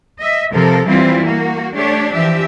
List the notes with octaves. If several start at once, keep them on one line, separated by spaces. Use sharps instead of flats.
D#5 E5
C3 F3 A4 A#4
E3 G3 C4 E4 F4
A#3 F#4
A3 D4 G4 C#5
E3 F3 G4 E5